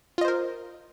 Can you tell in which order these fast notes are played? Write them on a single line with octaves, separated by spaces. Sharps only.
F4 D#5 C5 A#4